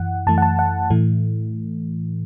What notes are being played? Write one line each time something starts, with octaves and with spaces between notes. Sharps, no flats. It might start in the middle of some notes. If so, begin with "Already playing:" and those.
Already playing: F#2 E3 F#5
F#2 E3 A3 A5
F#5
A5
F#5
A2 E3 A3